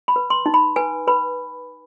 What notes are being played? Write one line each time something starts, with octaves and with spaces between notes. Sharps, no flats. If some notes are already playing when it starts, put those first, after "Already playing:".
B5
B4
C6
D#4
B5
B4 G#5
B4 B5